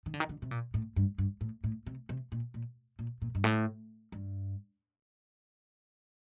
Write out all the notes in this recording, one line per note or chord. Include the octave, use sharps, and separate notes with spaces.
D#3
D3
D#3
D3
C3
A#2
A2
G2
G2
A2
A2
C3
C3
A#2
A#2
A#2
A#2
G2
A2
G2